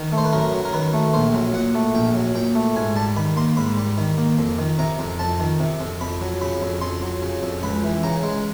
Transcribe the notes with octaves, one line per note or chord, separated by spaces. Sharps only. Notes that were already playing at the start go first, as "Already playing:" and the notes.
Already playing: D#3
A3
C5
B4
F#2 A#4
F#3
A#4
D#3 B4
A3
A#1 C5
F#3
A#2 F#5
A3
A#1 G5
F#3
A#2 G5
A3
G#2 G#5
G3 A5
D#3 B5
A#3 C6
G#2 B5
G3
D#3
A#3
F2
D#3
C3 A#5
F2
F2 A5
D#3
C3
F2
F2 B5
F#3
C#3 B5
F2
F2 C6
F#3
C#3
F2
C#2 B5
E3
C#3 A#5
G#3